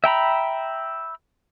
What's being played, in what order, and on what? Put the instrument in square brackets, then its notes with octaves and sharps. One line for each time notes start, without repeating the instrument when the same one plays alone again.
[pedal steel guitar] E5 G5 A#5 B5